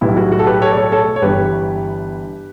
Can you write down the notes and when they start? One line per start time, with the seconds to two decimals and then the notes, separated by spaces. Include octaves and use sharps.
0.01 B1 A2 G3 B3 E4
0.17 F#4
0.32 F#4
0.39 A4
0.47 G4 B4
0.62 A4 C#5
0.72 D5
0.77 A4 C#5
0.92 A4 C#5
1.16 C#5
1.22 G1 G2 E3 B3 G4 B4